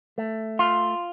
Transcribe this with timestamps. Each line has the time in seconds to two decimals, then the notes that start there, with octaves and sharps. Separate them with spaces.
0.18 A3
0.59 F4